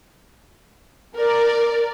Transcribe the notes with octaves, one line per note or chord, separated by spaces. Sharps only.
A#4 D5